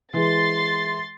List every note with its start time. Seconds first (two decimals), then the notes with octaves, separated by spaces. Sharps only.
0.14 E3 G#3 C6 A6